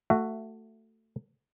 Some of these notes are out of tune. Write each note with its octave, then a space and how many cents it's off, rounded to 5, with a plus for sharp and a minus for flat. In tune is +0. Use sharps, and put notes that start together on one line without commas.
A3 +15 F#4 +0 E5 +25